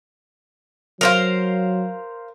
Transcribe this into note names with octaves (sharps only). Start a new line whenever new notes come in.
F#3 A#4 C5 F5